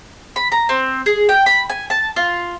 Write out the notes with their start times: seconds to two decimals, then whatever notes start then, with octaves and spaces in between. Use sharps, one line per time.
0.36 B5
0.52 A#5
0.69 C4
1.06 G#4
1.29 G5
1.46 B5
1.70 G#5
1.90 A5
2.16 F4